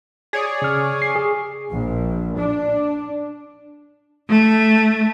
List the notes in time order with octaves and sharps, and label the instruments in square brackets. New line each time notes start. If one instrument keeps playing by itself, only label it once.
[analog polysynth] G#4 C#5 D5
[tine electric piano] C#3 F6
C7
G#4
[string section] A#1
D4
[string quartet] A3